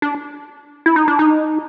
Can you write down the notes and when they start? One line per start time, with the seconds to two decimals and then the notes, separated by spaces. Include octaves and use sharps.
0.02 D4
0.86 E4
0.96 D#4
1.08 D4
1.19 D#4